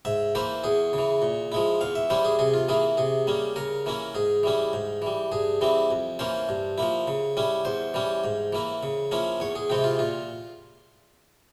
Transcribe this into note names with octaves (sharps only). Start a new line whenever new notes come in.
G#2 E5
E3 A#3 E4 C5
E2 G#4
C#3 E3
A#2
F3 G#3 E4
E2 F5
E5
E3 G3 C#4 E4 C5
G#4
C3 G#4
F4
E3 A#3 E4 G#4
C3 G#4
G3 A#3 C#4
C#3 A#4
E3 A#3 C#4 E4
G#2 G#4
E3 G3 C#4 E4
G#2
E3 G3
G2 G#4
E3 G3 C4 E4
F2
E3 A#3 C#4 C5
G2
F3 A#3 E4
C#3
G3 C#4 E4
E2 C5
E3 G3 C#4
G#2
E3 A#3 E4
C#3
F3 A#3 C#4 E4
E2 C#5
G#4
C3 E3 G#3 C4 G4
F4
A#2 F4